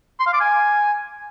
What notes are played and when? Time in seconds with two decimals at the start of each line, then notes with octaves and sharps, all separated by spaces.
0.20 C6
0.27 F5
0.33 D6
0.40 G#5